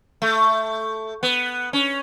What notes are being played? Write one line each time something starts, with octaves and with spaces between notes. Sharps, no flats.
A3
B3
C#4